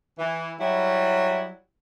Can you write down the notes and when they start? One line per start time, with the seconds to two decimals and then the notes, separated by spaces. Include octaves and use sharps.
0.19 E3
0.59 F#3 G3 E4